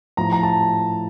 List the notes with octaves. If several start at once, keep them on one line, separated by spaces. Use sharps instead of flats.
A2 F3 A#5
A#5
A5